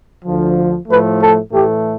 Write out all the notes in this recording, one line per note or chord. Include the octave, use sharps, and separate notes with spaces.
D2 D3 F3
A2 F3 A3 B4
A4
A2 E3 A3 G4